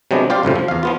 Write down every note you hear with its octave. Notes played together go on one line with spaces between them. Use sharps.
C3 F#3 G#3 B3 D4
F4 G4 C5 D5 F5
C#2 F#2 A2 C3
F3
E2 F5
F3 B3 F4